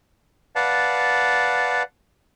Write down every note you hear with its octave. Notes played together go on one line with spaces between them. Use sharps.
B4 D5 F5 F#5 A5